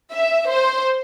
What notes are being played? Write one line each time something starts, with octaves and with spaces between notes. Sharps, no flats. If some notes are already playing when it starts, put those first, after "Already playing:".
E5
C5